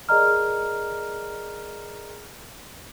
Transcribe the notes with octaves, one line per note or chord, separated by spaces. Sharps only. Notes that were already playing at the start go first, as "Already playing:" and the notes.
G#4 A#4 D5 D#5 A#5 F6